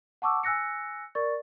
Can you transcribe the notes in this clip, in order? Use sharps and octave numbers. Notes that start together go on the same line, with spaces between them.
F#5 A5 C#6 D6 E6
G#5 E6 F#6 A#6 C#7
A#4 D5 C#6 A6